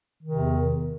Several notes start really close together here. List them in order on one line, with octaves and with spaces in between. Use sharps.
D#3 C3 E2